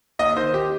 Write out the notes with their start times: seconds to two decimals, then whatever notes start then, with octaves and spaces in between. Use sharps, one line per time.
0.19 D#2 D#5
0.36 D#3 C5
0.54 G4